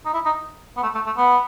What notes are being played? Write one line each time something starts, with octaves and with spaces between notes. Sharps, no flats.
D#4
E4
D#4
B3
A3
A3
A3
B3